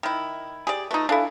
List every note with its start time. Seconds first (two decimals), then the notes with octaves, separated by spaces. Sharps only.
0.03 D#3 E4
0.67 G4 G#4 D5
0.91 A3 D#4 F4 B4
1.09 D4 E4 A4 F5 G#5